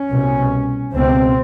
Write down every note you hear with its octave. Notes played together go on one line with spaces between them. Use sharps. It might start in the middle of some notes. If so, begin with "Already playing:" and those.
Already playing: C#4
C2 B2
C#2 B2 C4